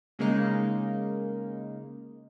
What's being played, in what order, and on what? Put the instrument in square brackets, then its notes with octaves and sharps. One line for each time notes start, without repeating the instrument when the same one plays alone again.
[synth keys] C#3 G#3 A#3 D#4